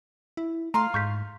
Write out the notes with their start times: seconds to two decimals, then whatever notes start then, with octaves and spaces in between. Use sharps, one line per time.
0.37 E4
0.74 A3 F4 F5 A#5 C6
0.94 G#2 C#6 G6 B6